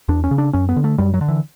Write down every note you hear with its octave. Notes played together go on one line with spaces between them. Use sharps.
E2 D4
C#4
C#3
D4
F#2 C#4
B3
D3
A3
F#2 G3
F#3
D3
E3